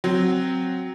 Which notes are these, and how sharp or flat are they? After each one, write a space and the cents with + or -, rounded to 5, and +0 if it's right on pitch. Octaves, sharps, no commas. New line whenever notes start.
F#3 +0 C4 +0